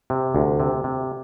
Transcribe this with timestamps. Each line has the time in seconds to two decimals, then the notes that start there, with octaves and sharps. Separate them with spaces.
0.10 C3
0.35 D2
0.60 C3
0.84 C3